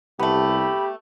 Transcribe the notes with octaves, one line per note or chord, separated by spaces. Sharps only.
C2 A3 B3 G4 B5